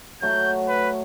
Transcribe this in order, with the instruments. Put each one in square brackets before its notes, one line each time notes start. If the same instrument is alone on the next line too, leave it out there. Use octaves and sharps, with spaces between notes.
[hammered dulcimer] F#3 A3 F#4 [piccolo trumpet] G6
[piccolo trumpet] B4